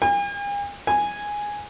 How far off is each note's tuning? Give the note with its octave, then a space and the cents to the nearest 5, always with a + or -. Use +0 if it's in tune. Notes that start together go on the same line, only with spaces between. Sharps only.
G#5 -45
G#5 -5